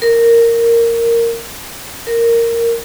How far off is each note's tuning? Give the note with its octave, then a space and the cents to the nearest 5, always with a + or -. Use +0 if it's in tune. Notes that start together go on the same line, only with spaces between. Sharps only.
A#4 -10
A#4 -10